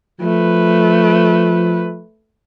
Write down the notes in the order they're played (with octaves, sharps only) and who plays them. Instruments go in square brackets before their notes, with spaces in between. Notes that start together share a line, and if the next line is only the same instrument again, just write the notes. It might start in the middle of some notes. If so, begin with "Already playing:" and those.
[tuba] F3 [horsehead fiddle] A3 B4